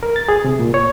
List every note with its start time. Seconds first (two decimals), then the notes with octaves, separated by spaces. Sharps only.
0.03 A#4
0.16 A6
0.29 G#4
0.45 C3
0.59 A#2
0.74 C#5